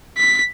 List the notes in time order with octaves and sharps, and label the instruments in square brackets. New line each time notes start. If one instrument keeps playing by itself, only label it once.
[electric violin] B6